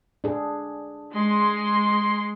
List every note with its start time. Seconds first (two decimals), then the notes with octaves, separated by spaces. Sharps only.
0.24 D4 G#4 A4
1.13 G#3 C6